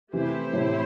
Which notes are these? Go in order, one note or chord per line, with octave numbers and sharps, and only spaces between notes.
C3 E3 A3 E4 G4 C5
A2 C3